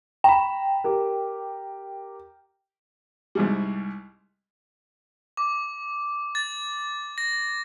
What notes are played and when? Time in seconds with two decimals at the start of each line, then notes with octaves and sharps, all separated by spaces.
0.24 G5 A#5 B5
0.84 G4 A#4
3.35 C2 G#2 G3
5.37 D6
6.35 A6
7.18 A#6